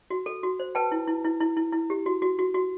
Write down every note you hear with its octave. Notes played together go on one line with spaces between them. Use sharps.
F#4
A4
F#4
C5
B4 G5 A5
E4
E4
E4
E4
E4
E4
G4
F#4
F#4
F#4
F#4